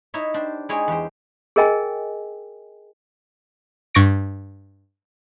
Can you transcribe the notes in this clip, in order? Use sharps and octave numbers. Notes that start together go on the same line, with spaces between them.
D#4 E4 C#5 E5
D4 G4 C5
G#3 E4 G#4 C#5 G5 G#5
E2 G4 C5
G#4 A#4 D#5 G5 G#5
G2 C#6 A#6 D7